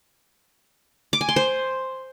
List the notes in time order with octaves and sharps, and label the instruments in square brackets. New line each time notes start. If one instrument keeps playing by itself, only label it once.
[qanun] D6
G#5
C6
C5